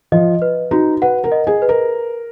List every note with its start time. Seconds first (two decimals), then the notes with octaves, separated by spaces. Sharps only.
0.12 F3 D#5
0.42 B4
0.71 D#4 F#4
1.02 B4 F#5
1.24 A#4
1.32 D#5
1.47 G#4
1.62 B4
1.69 A#4